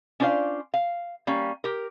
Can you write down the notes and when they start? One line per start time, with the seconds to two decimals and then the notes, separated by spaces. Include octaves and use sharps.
0.20 C#4 D4 F4 C5 D5 F5
0.74 F5
1.27 G3 A#3 C#4 F5
1.64 G4 A#4